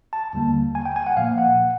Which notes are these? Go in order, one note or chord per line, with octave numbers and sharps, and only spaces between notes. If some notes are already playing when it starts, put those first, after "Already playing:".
A5
D#2 D3 G3 A#3
G#5
G5
G#5
F#5
A#2 F3 A#3 F5
F#5